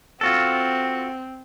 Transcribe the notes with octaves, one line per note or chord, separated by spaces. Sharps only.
C4 F4 F#4 A4